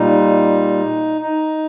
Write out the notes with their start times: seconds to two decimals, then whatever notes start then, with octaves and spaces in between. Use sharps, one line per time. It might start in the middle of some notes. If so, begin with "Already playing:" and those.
Already playing: A#2 G3 D#4
1.22 D#4